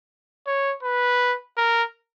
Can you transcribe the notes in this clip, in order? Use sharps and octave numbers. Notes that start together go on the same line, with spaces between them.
C#5
B4
A#4